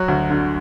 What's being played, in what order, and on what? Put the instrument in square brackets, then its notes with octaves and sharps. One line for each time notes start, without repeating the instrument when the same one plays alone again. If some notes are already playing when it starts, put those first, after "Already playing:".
Already playing: [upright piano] F#3 F#4
D2
D3